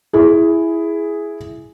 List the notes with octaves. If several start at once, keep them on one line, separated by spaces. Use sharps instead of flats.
E4 G#4